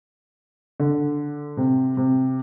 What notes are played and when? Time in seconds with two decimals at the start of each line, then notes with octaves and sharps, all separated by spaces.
0.80 D3
1.57 C3
1.97 C3